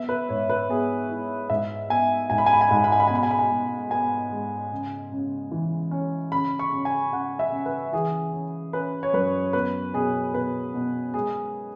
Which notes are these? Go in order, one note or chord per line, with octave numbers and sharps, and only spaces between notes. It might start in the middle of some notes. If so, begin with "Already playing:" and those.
Already playing: B3 E5
B4
G#2 C#5
B4
B3 G#4
E4
G#2 E5
B3 G#5
G#2 G#5
B5
G#5
B5
G#5
G#2 B5
G#5
B5
G#5
B5
G#5
B2 B5
G#5
B5
G#5
B2
B3 G#5
G#3
C#3
C#3
E3
C#4
C#3 B5
C#6
C#3
G#5
C#3 F#5
E5
C#3
B4
E3 G#4
C#4
C#4 B4
C#5
F#2 B4
B3 B4
B2 G#4
B2 B4
B2
G#3 G#4